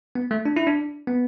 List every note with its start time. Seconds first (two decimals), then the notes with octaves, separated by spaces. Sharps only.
0.15 B3
0.31 A3
0.45 D4
0.56 E4
0.67 D4
1.07 B3